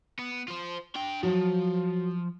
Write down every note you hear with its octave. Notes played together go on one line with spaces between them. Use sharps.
B3
F4 C5
D4 G5
F3 F#3